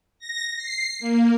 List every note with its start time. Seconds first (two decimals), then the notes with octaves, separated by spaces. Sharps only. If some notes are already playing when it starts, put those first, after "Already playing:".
0.19 A#6
0.56 C7
0.99 A#3